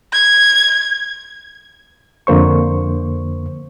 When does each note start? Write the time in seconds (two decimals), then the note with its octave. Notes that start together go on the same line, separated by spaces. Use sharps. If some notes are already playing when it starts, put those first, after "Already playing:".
0.13 G#6
2.27 F2 D3 A#3 C5 C#6